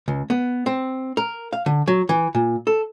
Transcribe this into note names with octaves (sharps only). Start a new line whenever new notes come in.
C#2
B3
C4
A#4
F5
D3
F#3
E3
A#2
A4